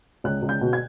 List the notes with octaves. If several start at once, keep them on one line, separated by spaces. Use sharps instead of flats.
C#2 F#6
C#2
G6
B2
G#6